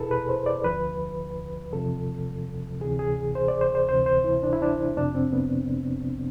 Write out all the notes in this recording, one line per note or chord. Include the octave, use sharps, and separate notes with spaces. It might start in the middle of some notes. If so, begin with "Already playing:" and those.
Already playing: E2 B2 E4 G#4 A4 B4
B4
C5
D5
D2 D3 F3 B4
E2 C3 F3 A4
D2 C3 E3 G#4
G#4
C5
D5
C5
C5
D2 C3 E3 C5
C5
E4
D4
E4
D4
F2 C3 F3 D4
C4
B3